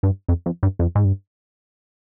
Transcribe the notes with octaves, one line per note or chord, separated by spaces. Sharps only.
G2
F2
F2
G2
F2
G#2
G2